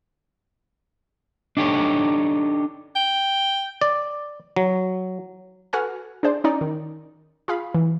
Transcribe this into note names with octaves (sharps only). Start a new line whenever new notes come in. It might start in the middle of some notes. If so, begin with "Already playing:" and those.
D4 D#4 G4 A4 C#5
G5
D5
F#3
F#4 A4 B4 F#5 G#5 F6
D4 G#4 C5 D5
C#4 D#4 D5
D#3
F4 G#4 F5 B5
E3